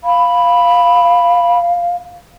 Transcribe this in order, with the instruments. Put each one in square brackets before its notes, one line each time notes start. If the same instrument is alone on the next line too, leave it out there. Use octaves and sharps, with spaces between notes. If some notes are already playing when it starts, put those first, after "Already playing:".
[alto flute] F5 [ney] B5